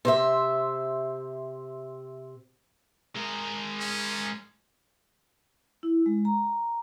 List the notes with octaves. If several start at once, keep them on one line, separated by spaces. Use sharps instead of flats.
C3 C5 E5
G#3 A#4
C#4
E4
G#3
A#5